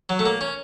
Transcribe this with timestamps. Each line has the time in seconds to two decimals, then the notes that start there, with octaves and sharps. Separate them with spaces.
0.09 F#3
0.19 A3
0.26 A#3
0.41 C#4